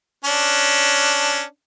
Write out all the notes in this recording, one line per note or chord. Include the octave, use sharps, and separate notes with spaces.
C#4 D4